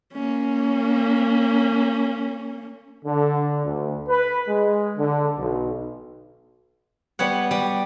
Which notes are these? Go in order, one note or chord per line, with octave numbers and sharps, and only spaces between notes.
A#3 C#4
D3
D2
B4
G#3
D3
B1
G3 B3 C#5 F#5
G3